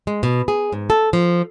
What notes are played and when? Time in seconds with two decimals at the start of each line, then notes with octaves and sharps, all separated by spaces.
0.07 G#3
0.23 B2
0.48 G#4
0.72 G#2
0.90 A4
1.13 F3